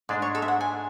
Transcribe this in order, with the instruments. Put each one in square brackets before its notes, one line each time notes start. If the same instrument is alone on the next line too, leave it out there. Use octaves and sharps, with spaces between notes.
[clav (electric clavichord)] G#2 G#3 D4 [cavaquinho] D5
[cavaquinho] C#5
A4
E5
F#5
G#5